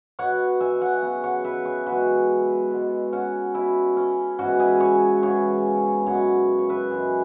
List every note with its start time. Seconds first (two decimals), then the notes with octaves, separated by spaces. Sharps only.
0.19 B2 B3 C#5 F#5
0.61 E5 G#5
0.81 C#5 F#5
1.02 C#3 F#3 B3
1.24 C#5 F#5
1.44 B4 E5
1.65 G#4 C#5
1.86 F#2 E3 G#3 B3 F#4 B4
2.71 B2 G#3 B3
3.13 C#4 F#4
3.54 B2 B3 E4
3.97 C#4
4.39 G#2 E3 B3 C#4 F#4
4.59 E4 G#4
4.80 G#4 C#5
5.22 C#3 E3 B3 G#4 C#5
6.06 F#2 C#3 G#3 B3 C#5 F#5
6.58 C#5
6.69 B4 E5
6.90 F#2 E3 G#3 G#4 C#5